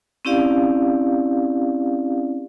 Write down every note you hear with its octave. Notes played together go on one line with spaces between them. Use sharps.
C4 C#4 E4 G4 D5 F5